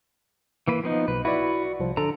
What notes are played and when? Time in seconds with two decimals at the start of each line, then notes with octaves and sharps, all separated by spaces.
0.68 E3 A#3 B4
0.84 F3 B3 D#4
1.08 B1 B4
1.25 E4 F#4 B4 D5
1.80 C2 F3
1.97 D3 A4 A#5